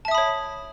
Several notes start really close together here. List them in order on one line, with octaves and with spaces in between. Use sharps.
A5 E5 D#6 B5 C#5